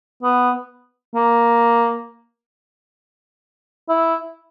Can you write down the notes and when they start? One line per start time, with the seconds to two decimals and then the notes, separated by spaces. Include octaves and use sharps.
0.23 B3
1.15 A#3
3.89 E4